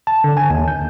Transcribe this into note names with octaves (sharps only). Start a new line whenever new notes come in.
A5
D3
G#5
D#2
G6